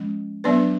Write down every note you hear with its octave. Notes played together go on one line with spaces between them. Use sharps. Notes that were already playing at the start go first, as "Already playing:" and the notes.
Already playing: F3 G#3 C#4
F#3 B3 D4 B4 D5